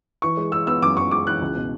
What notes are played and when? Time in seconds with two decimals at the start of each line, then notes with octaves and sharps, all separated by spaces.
0.22 E3 C#6
0.37 G#3
0.52 G#3 E6
0.67 B3 E6
0.82 F#2 D6
0.97 B3 C#6
1.11 G#3 D6
1.26 E3 F#6
1.42 C#2
1.55 B2